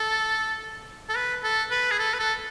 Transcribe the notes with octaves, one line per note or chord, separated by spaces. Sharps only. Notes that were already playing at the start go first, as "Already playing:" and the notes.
Already playing: A4
A4
B4
A4
B4
G#4
A4
B4
A4